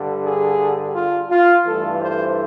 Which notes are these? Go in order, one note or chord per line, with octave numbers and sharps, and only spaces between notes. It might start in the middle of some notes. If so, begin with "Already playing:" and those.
Already playing: G2 D3 G3
G#4
F4
F4
G2 E3 A3 A4
C5